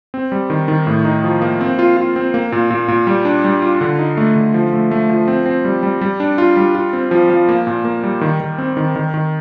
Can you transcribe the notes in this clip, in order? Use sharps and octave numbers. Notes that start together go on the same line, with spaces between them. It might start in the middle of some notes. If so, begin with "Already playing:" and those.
C4
G3
D#3
D#3
A2
D#4
F3
A#3
C4
F4
F4
C4
A#3
A#2
A#2
A#2
G3
D4
G3
F4
D3
D#4
A3
D3
F3
A3
A3
F3
C4
C4
G3
G3
G3
D4
F4
G3
F4
C4
F3
F3
A#3
A#2
A#3
G3
D#3
D#3
C4
D#3
D#3
D#3